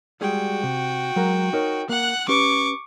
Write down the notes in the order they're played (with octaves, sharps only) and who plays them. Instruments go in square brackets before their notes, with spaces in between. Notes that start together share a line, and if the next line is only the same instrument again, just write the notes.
[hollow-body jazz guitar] G3 G#3 G#4 [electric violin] F#4 G5
[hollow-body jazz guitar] C3
F#3 G#3 A#4
D#4 A#4 C#5
[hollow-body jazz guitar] A#3 [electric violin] F#5 F#6
[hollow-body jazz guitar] C#4 G4 B4 [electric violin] C#6 D6